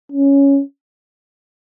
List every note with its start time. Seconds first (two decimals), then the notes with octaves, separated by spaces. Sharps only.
0.12 C#4